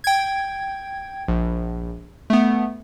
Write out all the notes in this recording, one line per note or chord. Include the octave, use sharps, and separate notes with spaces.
G5 G#6
A#1
A3 B3